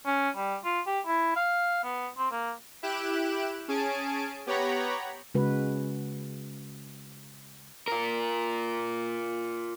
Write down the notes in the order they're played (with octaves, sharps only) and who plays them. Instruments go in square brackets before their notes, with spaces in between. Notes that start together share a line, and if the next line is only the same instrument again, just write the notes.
[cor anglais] C#4
G3
F4
G4
E4
F5
B3
C4
A#3
[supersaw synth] E4 G4 F#6 D7 E7
C#4 G#4 G#5 A5 D7
B3 G4 C#5 F#5 A#5 B5
[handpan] C#3 G#3 F#4 B4
[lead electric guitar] F4 A#4